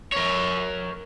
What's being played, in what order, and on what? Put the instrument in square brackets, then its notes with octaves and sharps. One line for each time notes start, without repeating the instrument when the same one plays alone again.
[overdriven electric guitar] A#4 C#5